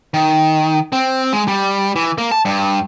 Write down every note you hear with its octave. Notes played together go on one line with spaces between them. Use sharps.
D#3
C4
G#3
G3
E3
A#3
A5
G2